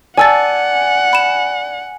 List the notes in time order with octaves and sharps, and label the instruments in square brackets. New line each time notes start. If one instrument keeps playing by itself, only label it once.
[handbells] D5 [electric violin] F#5 [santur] G#5 [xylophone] A5 E6 A6
[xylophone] B5 E7